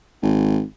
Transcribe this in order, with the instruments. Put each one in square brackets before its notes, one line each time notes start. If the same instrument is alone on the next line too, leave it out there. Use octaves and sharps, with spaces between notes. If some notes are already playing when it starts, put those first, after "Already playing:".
[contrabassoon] G#1